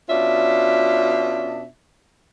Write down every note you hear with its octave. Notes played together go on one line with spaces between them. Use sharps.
B2 C#4 D4 F4 E5